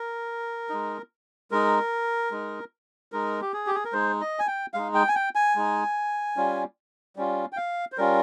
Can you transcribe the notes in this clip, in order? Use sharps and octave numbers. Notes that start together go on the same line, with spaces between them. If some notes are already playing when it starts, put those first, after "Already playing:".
Already playing: A#4
G#3 D#4
G#3 D#4 A#4
G#3 D#4
G#3 D#4 A#4
G4
G#4
G4
G#4
A#4
G#3 D#4 C5
D#5
G#5
G5
G#3 D#4 F5
G5
G#5
G5
G#5
G#3 D#4
G3 C#4 F4
G3 C#4 F4
G5
F5
C5
G3 C#4 F4 A#4